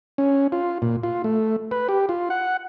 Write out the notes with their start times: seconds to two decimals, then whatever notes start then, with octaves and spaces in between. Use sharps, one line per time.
0.18 C#4
0.52 F4
0.82 A#2
1.03 F4
1.24 A3
1.71 B4
1.89 G4
2.09 F4
2.30 F#5